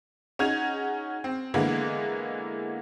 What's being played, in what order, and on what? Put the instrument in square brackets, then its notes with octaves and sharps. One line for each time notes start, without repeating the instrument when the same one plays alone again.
[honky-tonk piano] C#4 D#4 F#4 G#4 G#6 F7
C4
D3 E3 G#3 A#3 B3